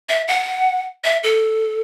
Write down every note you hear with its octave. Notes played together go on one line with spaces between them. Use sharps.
E5
F#5
E5
A4